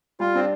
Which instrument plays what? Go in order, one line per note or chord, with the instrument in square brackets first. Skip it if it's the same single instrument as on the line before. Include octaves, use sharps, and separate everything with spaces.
[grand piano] G3 [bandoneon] F4
[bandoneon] C4 [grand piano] D4